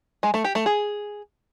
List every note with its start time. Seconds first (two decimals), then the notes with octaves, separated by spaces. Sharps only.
0.23 G#3
0.34 A3
0.44 G4
0.55 A3
0.66 G#4